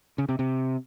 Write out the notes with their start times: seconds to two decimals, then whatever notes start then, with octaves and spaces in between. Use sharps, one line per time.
0.18 C#3
0.29 C3
0.39 C3